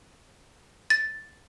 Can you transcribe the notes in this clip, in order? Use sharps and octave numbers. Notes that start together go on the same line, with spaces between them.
A6